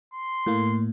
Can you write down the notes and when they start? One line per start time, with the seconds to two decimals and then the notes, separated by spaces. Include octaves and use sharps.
0.14 C6
0.46 A2 A#3